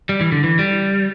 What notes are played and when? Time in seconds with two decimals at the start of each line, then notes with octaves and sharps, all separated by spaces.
0.09 G3
0.21 E3
0.32 D3
0.44 E3
0.59 G3